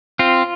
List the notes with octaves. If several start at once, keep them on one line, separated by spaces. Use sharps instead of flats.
C4 F4